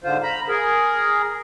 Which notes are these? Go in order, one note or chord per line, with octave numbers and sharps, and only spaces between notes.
G#2 D3 F4 C5
A#5 B5
G#4 A#4